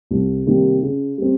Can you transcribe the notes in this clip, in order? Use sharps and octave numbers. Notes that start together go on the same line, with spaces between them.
C2
C3 D#3 G3 A#3
C#3
G3 C4